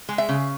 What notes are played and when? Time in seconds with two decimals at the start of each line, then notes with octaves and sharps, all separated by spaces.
0.09 G#3
0.18 E5
0.29 C#3